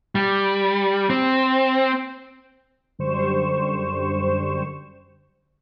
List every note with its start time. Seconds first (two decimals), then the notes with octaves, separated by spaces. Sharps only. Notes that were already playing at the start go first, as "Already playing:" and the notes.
0.15 G3
1.10 C4
2.99 F#2 D3 G3 C5 C#6 E7